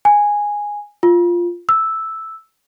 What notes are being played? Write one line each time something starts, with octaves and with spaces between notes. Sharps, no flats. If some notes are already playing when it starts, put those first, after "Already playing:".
G#5
F4
E6